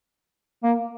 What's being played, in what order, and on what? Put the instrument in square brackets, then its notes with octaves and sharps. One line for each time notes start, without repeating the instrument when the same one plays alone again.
[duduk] A#3